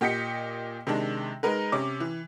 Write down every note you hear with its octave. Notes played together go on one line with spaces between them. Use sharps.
A#2 G4 D#5 G5 B6 C#7
C3 D#3 G#3 D4
G#3 D#4 A#4 B4
C3 C#4 D6
E3